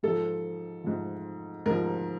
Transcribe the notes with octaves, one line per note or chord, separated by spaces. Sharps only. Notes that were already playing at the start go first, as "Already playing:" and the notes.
G#2 F3 A4
G#2 F3
G#2 F3 A#4